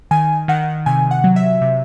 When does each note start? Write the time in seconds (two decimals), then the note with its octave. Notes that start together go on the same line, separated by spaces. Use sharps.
0.11 D#3 G#5
0.48 D#3 F#5
0.86 C3 G#5
1.11 F#5
1.24 F#3
1.36 E5
1.61 C3